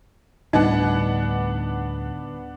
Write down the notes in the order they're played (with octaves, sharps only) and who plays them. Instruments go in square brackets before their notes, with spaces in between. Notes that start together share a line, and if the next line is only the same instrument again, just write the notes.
[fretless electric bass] D2 A2 G3 [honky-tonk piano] B3 D4 F#5 [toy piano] D#4 D#5